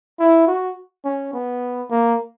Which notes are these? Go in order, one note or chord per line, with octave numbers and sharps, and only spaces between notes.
E4
F#4
C#4
B3
A#3